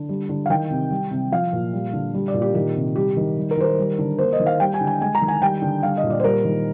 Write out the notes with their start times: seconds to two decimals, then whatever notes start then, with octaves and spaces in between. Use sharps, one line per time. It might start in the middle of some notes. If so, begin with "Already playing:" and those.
Already playing: D3
0.09 G3
0.29 D3
0.46 F5
0.50 D#3 G5
0.71 C3
0.91 G3
1.11 C3
1.32 F3 F5
1.53 A#2
1.73 G3
1.93 D3
2.14 G3
2.28 D5
2.34 A#2
2.42 G4
2.54 D#3 G4
2.75 C3
2.96 G3 G4
3.17 D#3
3.37 G3
3.51 A#4
3.57 D#3 C5
3.64 A#4
3.78 G3
3.99 D3
4.18 A#3 C5
4.33 D#5
4.40 D#3
4.46 F5
4.60 G3 G5
4.74 G#5
4.81 D3
4.87 G#5
5.00 G#3 G#5
5.15 A#5
5.22 D#3
5.28 G#5
5.42 G3 G5
5.62 D3
5.83 G3 F5
5.97 D#5
6.03 A#2
6.10 D5
6.20 C5
6.24 G3 A#4
6.45 D#3